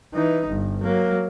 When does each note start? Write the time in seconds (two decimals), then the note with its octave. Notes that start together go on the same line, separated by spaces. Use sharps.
0.14 E3 D#4
0.48 G1
0.82 F#3 A#3